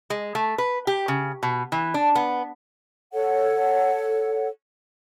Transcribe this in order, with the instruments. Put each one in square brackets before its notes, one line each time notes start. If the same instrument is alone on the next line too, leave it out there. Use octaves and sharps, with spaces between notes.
[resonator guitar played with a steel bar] G#3
A3
B4
G4
C#3
B2
E3
D4
B3
[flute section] A4 C#5 F#5